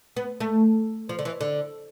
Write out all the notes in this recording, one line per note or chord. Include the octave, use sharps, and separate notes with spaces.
B3
A3
F3
D3
E3
D3